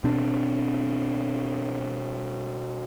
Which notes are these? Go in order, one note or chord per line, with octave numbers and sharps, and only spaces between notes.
B2 C4 D4